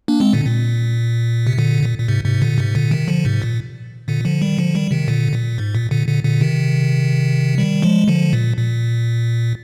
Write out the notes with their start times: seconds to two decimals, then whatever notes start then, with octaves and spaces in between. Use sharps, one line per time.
0.08 A#3 D4
0.20 G#3 C4
0.33 A#2 D3
0.46 A#2
1.47 C3
1.58 A#2 D3
1.83 A#2
1.98 A#2
2.08 G#2 C3
2.25 G#2 C3
2.42 A#2 D3
2.58 G#2 C3
2.75 A#2 D3
2.91 C3 D#3
3.08 D3 F3
3.25 G#2 C3
3.42 A#2
4.08 A#2 D3
4.24 D3 F3
4.42 D#3 G3
4.58 D3 F3
4.75 D#3 G3
4.91 C3 D#3
5.08 A#2 D3
5.32 A#2
5.58 G#2
5.75 A#2
5.91 A#2 D3
6.08 A#2 D3
6.24 A#2 D3
6.41 C3 D#3
7.58 D#3 G3
7.82 F3 G#3
8.08 D3 F3
8.33 A#2
8.57 A#2